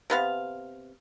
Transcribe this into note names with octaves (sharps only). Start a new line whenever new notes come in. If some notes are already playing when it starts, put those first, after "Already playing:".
C3 B3 F5